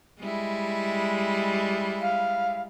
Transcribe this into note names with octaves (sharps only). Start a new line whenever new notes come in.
G3 G#3 E4
F5